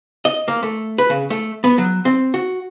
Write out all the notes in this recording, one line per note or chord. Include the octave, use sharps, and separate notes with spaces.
D#5
A#3
A3
B4
C#3
A3
B3
F#3
C4
F#4